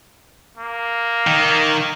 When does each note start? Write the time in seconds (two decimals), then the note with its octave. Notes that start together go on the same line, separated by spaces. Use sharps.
0.57 A#3
1.27 D#3